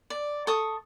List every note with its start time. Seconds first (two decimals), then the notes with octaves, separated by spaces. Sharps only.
0.10 D5
0.47 A4 C#6 D#6